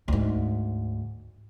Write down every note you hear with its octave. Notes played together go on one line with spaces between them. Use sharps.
D2 G#2